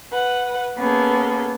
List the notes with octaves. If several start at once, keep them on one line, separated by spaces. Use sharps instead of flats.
B4 F#5
A#3 B3 C#4 G#4 A4